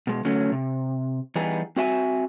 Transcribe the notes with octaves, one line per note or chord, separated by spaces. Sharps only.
B2 G#3
D3 F#3 A3 C#4
C3
E3 G3 B3 D#4 G#4
C4 F#4 E5 G#5